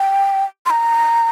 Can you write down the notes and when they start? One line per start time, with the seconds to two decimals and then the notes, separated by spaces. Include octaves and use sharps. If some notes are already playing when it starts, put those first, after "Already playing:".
Already playing: G5
0.66 C6
0.70 A#5